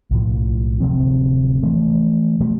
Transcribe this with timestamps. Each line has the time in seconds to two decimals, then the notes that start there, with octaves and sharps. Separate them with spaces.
0.11 B1 A2 F3
0.80 D1 C3 F3 C4
1.63 E3 F3 A3
2.40 B2 F3 G3 A3